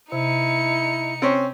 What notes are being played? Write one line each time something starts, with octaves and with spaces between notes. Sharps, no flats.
C3 D#4 E4 C#7
C4 C#4